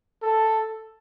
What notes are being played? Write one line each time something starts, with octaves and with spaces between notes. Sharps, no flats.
A4